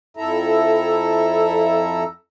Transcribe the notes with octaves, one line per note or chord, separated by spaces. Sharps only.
F2 E4 A4 E5 A#5